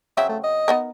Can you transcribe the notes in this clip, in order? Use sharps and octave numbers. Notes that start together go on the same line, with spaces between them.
C#3 F#3 C4 E5
A3
D#5
B3 D#4 A#4